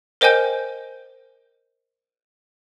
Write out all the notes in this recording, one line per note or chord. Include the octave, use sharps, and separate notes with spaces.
A#4 C5 D#5 G5 G#5 G6